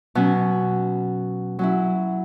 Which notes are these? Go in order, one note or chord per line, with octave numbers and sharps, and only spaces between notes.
B2 F#3 C#4
F#3 C#4 E4